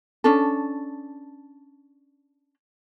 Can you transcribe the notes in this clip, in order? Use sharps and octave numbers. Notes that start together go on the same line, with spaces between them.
C#4 D4 A4